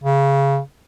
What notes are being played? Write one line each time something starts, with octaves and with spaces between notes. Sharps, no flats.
C#3